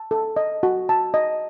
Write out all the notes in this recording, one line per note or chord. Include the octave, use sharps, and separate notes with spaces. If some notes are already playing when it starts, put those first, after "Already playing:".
Already playing: A5
A4
D#5
F#4
A5
D#5